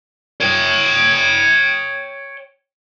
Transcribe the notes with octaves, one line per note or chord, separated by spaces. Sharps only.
C#5 G5